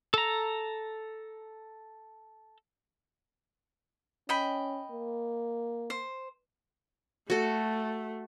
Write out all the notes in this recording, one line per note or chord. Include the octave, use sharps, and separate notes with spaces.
A4 A#5
C#4 D#5 G5 B5
A#3
C5
A3 F#4 A4